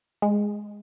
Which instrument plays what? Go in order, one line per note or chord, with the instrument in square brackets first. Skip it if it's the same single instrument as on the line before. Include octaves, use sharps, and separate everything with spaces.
[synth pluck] G#3